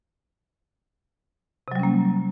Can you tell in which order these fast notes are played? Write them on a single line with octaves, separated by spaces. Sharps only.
C3 F#3 G3 C#4 A#3